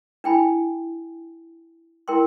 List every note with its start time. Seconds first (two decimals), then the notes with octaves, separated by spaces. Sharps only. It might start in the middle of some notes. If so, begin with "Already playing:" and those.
0.24 D4 E4 G5 G#5 B5
2.08 E4 A#4 G5 C6